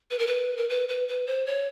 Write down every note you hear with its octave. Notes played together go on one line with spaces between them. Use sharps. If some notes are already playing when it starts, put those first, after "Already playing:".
B4
A#4
B4
A#4
B4
B4
B4
C5
C#5